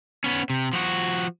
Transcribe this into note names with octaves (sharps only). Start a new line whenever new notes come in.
B3 C#4
C3
F3 F#4